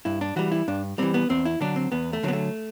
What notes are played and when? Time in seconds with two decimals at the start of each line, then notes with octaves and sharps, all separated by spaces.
0.05 G2 E4
0.21 D4
0.36 E3 G3 F#4
0.52 E4
0.68 G2 D4
0.98 E3 G3 C4
1.14 B3
1.30 E2 C4
1.45 E4
1.61 D3 F#3 D4
1.76 C4
1.92 E2 B3
2.13 A3
2.23 D3 F#3 B3
2.33 A3